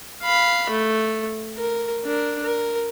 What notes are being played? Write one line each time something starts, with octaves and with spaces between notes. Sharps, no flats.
F5 B5
A3
A#4
D4 A#4
A#4